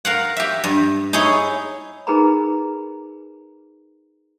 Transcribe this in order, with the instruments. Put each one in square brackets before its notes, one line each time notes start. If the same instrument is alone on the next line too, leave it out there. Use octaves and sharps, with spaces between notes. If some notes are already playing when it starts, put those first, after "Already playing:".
[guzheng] A#4 F5 F#5
G4 E5
G2
D#4 E4 G#4 C#5
[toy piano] D#4 G#4 A#4 B4 A#5 B5